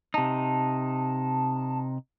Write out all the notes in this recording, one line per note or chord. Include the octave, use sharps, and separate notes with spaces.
C3 D#4 A5